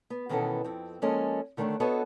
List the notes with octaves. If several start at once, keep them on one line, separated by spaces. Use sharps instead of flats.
B3
B2 D#3 E3 C#4 A4 F#5
F2 C4
F3 G#3 A#3 C#4 A4 D#5
D3 D#3 A3 C#4 D4 C#5
B3 D4 F#4 A4 C#5 D#5